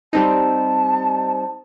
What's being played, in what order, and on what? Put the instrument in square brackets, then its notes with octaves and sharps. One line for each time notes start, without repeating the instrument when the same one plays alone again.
[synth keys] G3 C4 D#4 [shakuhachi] A5